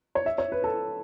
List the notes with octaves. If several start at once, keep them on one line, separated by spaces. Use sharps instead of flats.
C#5
E5
C#5
B4
A4